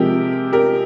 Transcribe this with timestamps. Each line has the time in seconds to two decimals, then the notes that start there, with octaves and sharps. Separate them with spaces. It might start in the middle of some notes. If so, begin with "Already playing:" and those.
Already playing: C3 F3 G#3 G4 A#4
0.52 G4 A#4